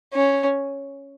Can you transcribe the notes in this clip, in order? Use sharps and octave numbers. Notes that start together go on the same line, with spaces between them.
C#4